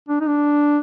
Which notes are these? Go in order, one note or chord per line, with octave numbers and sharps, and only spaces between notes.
D4
D#4
D4